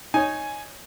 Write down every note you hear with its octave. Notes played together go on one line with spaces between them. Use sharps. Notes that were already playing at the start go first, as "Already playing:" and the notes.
D#4 C#5 G#5